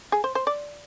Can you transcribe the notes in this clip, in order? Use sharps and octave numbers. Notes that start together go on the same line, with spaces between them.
G#4
C5
C5
D5